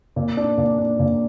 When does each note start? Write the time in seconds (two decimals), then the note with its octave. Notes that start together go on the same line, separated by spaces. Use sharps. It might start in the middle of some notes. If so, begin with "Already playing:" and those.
0.16 A#2
0.37 D4
0.58 A#2
0.79 D4
0.99 A#2